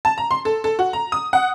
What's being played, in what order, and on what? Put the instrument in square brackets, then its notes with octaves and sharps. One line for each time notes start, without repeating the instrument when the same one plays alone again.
[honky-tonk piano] A5
A#5
C6
A4
A4
F#4
A#5
D#6
F#5